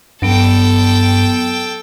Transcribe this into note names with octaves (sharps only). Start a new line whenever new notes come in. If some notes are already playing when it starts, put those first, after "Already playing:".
G2 F#3 B3 A4 G5